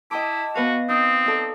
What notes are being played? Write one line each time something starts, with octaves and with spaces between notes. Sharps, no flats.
E4 D#5 G5 A5 D6
B3 F#4 B4 F5
C4 D#4 D#6
D#4 A4 D5